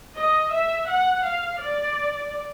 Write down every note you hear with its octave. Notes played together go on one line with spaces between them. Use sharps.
D#5
E5
F#5
F5
D5